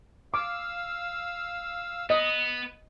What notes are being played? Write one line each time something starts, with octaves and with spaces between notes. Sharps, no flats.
F5 D6 E6
B3 D#5